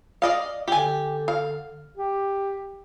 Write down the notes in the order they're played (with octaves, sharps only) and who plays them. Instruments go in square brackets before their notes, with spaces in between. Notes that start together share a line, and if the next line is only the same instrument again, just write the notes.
[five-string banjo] D5 D#5 F5
[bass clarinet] D3 [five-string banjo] G4 G#5
[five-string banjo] F5
[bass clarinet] G4